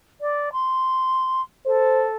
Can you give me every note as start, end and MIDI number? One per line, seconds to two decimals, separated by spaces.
0.21 0.49 74
0.52 1.41 84
1.66 2.16 69
1.66 2.06 72